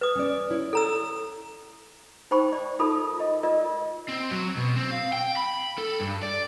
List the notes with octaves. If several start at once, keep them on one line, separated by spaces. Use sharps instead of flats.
B4 D#6
C#4 D5
E4 C#5
A4 A#5 E6
D#4 C5 G5 B5 C#6
D5
D#4 F4 A4 A#4 B5 D#6
F4 D#5
F4 A#4 D5 D#5
C4
F#3
B2
C4
F5
G5
B5
A4
G2
D5